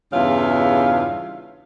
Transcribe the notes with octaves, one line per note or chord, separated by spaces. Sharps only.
E2 G2 C#3 F4 E5 F5